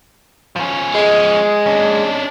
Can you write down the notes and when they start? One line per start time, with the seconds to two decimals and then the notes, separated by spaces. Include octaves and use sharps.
0.56 F3 C#4
0.95 G#3
1.67 C#4 D4